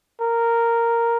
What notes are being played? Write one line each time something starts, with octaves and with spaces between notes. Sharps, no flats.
A#4